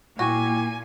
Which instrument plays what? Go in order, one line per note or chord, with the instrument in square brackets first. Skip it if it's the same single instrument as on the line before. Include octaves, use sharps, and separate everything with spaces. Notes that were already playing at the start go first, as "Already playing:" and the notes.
[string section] A#2 [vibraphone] E4 G5 D6 [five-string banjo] F#4 [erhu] G#5